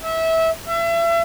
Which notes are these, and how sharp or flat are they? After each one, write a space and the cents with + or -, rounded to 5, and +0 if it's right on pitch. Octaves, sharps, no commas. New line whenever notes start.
E5 -20
E5 +35